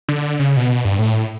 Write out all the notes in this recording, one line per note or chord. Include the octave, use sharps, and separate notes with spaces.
D3
C#3
B2
G2
A2